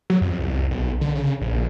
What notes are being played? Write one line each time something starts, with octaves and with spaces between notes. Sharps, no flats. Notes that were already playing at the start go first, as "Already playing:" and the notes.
F#3
F2
C2
B1
D3
C#3
A#1